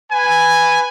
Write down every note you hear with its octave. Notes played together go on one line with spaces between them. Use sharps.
B4 G#5